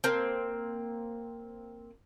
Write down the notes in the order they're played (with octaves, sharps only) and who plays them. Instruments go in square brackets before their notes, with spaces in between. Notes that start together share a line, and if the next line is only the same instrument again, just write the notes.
[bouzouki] A#3 C4